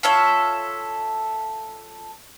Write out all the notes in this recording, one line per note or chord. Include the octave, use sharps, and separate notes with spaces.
F4 A4 C#5 E5